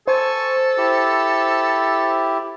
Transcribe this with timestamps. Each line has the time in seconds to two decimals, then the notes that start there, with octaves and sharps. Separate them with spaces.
0.08 A4 C5 G#5 A5 C#6
0.78 E4 G4